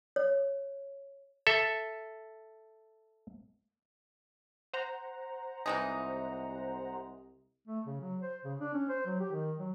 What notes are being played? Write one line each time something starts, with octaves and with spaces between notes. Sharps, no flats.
C#5
A4 E5
C5 F#5 A#5
C2 E3 G#3 D#4
A3
C#3
F#3
C5
C#3
D4
C#4
C5
F#3
G4
D#3
F#3